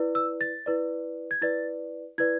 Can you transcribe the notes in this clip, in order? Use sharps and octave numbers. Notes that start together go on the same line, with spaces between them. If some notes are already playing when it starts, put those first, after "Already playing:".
Already playing: E4 B4 D5
E6
A6
E4 B4 D5
G#6
E4 B4 D5 A6
E4 B4 D5 G#6